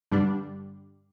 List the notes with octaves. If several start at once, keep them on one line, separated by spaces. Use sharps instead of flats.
G2 D3 G3 D4